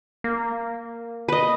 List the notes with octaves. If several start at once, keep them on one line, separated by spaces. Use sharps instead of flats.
A#3
B4 D#5